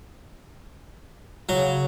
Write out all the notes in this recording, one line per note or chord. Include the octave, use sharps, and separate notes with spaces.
C#3 F#3